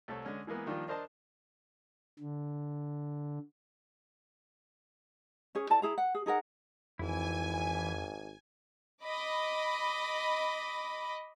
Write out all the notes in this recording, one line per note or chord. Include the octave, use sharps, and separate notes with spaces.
C2 A3 A4 C#5
D3 G#3 C#4
E3 G#3 A#3 B3
D#3 F3 G3 A#3 D4 F4
D4 A#4 C5 D#5 A5
D3
C#4 G#4 C#5
E4 A4 D5 A5
E4 G#4 A#5
F#5
G#4
D#4 G#4 A#4 F#5
G#1 F2 E3 E4 G#5
D#5 B5 D6